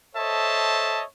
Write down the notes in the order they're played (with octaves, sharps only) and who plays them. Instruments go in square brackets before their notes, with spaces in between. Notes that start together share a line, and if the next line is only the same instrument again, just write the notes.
[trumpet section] A4 C5 C#5 D#5 E5 A5